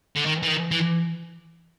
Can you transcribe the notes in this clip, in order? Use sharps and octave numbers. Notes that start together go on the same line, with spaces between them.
D3
D#3
E3
D#3
E3